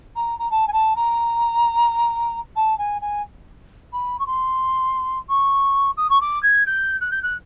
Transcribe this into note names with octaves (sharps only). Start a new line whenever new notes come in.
A#5
A#5
A5
G#5
A5
A#5
A5
G#5
G#5
B5
C#6
C6
C#6
D#6
C#6
D6
G#6
G6
F#6
G6
F#6